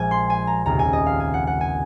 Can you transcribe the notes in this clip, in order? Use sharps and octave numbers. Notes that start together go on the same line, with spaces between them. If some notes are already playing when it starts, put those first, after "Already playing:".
Already playing: A#1 A#2 F3 G#3 G#5
C6
G#5
A#5
F1 D#2 C#3 A#5
G#5
D#5
F5
G#5
F#5
F#5
G#5